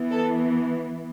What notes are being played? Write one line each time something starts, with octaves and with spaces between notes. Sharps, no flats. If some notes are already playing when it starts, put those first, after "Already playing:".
Already playing: E3 B3
A4